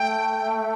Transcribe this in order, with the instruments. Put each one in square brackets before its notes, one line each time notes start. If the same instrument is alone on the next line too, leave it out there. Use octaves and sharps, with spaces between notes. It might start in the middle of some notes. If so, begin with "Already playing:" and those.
Already playing: [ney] A3 [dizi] G5